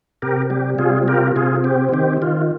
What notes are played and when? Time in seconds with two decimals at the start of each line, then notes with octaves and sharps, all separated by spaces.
0.22 C3 G4 A#4
0.50 G3 G4
0.79 C3 F4 G#4
1.07 F4 G4 A#4
1.36 C3 F4 G#4
1.64 C4 G4
1.93 D#3 G4
2.22 D#3 F4